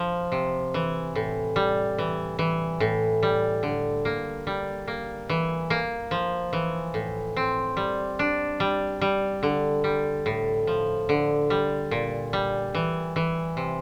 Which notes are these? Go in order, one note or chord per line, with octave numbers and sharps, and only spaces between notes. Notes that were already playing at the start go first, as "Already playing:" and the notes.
Already playing: F3
C3
E3
A2
G3
E3
E3
A2
G3
D3
A#3
G3
A#3
E3
A#3
F3
E3
A2
C4
G3
D4
G3
G3
D3
G3
A2
F3
D3
G3
A#2
G3
E3
E3
C3